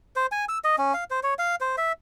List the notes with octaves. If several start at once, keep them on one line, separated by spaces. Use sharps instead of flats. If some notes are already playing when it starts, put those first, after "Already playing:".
C5
G#5
E6
D#5
C#4
F5
C5
C#5
F5
C5
E5